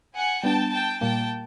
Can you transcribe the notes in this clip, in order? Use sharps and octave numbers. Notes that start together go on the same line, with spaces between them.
F#5 G#5
G3 B3 D4 G5 A5
G5 A5
A#2 G3 A#3 G5 A5